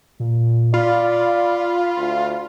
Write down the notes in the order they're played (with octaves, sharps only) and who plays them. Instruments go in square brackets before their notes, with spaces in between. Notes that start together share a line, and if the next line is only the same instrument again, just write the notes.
[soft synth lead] A#2
[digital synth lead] F4 [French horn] D5 [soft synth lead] B5
[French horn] D2